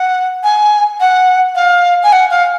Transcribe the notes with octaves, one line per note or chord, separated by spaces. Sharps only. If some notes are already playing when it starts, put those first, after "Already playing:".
Already playing: F#5
G#5
F#5
F5
G#5
F#5
F5